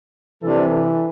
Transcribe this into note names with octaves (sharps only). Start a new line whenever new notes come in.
C3 E3 G3 D4 A4